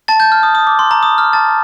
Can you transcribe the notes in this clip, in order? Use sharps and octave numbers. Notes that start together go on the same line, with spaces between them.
A5 A6
G6
F6
D#6
D#6
D6
C6
A#5
D#6
F6
A5 A6